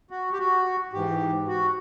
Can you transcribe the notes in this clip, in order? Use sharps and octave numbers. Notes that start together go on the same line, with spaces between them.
F#4
G4
F#4
G#2 E3 G4
F#4